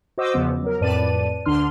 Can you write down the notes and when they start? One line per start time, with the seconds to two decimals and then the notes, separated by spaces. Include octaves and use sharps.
0.18 F#4 C5 D#5 D6 E6
0.34 E2 C#3 F3 B3
0.63 F#3 A#4
0.81 F2 A2 B4 D5 A5 D#7
1.46 D2 D3 D4 C6 F6